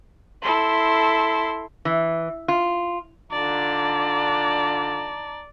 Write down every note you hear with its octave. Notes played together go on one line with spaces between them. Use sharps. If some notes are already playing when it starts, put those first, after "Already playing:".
E4 A4 C6
E3
F4
D3 D4 D#4 F4 D5 A5 A#5